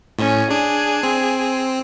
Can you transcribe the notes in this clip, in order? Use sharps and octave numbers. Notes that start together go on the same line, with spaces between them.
A2 C#4
D4 G#4
C4